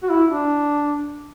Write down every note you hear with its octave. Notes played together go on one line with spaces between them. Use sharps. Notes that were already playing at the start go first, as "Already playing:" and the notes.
F#4
E4
D4